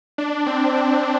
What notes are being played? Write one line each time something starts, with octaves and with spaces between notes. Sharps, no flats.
D4
C4
C4